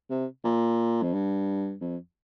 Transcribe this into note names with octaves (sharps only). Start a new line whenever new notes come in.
C3
A#2
F2
G2
F2